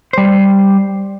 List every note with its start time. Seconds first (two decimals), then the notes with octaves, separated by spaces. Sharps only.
0.13 G3 C5